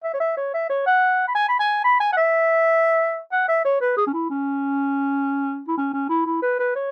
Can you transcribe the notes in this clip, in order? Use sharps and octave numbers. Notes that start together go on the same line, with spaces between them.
E5
C#5
E5
C#5
E5
C#5
F#5
B5
G#5
B5
G#5
B5
G#5
F#5
E5
F#5
E5
C#5
B4
G#4
C#4
E4
C#4
E4
C#4
C#4
E4
E4
B4
B4
C#5